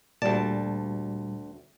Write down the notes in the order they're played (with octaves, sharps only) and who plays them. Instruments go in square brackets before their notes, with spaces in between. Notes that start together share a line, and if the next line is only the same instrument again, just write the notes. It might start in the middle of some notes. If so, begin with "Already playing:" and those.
[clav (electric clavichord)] D2 A5 [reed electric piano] A#2 G3 [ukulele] D5